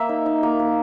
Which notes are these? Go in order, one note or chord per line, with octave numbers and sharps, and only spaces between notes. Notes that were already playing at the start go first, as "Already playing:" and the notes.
Already playing: A#3 E5
D#4
D#4
A#3
A#3